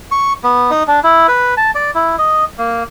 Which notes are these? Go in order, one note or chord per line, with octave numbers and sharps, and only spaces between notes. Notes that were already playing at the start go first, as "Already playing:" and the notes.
C#6
B3
D#4
D4
E4
B4
A5
D5
E4
D#5
A#3